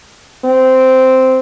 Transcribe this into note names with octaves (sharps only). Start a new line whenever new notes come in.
C4